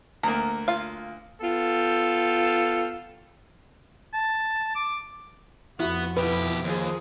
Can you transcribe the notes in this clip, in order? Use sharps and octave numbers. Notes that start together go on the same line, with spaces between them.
D2 A#3 A#5
F4 F5
B3 F4 A4 G5
A5
D6
F2 B3 E4 F#4
B2 E4 G4 B4
D#2 F3 G#4